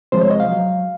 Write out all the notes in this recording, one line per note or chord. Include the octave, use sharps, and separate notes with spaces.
C2 C3 F3 G#3 C5
C#5
D#5
F5
F#3